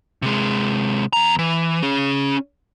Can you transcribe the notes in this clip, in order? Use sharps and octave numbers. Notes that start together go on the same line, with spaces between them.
C3 G#3
E2 A#5
E3
C#4 G#4